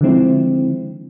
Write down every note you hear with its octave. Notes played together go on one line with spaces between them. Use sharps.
D3 D#3 F3 G#3 C4 E4